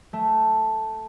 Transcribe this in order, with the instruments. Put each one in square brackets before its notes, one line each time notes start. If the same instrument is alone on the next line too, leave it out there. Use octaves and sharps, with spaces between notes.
[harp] A3